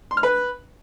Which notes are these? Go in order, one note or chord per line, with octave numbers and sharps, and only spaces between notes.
C6
F6
B4